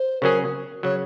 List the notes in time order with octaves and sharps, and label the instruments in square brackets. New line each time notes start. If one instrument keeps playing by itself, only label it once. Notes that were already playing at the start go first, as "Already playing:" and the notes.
Already playing: [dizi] C5
[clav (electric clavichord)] C#3 F#3 C#4 G#4 [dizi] A#4
[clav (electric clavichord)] C#3 F#3 [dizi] C#5